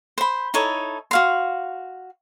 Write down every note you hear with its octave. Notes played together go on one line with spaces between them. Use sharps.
C5 B5
D#4 E4 A4 C#5
F#4 F5 C6